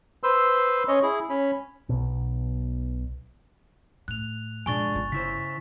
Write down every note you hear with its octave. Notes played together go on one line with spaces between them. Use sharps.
B4 C5 C6 E6
C#4 C#5 D#5
E4 G#4
C#4 B5
B1 B2
A2 F#6 F7
A#2 F3 G#3 D4 G#5 C#6 A6
G1 F4
C#3 E4 C5 B6